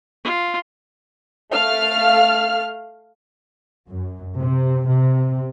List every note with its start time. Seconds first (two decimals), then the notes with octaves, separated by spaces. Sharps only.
0.24 F4
1.53 A3 F5 F6
3.90 F#2
4.39 C3
4.85 C3